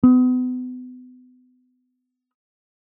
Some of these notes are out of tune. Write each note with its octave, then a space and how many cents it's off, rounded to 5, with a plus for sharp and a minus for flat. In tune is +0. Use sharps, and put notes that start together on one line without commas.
B3 +35